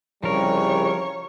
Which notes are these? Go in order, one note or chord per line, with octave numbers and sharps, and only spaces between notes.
C2 C#3 F3 G3 A#4 C#5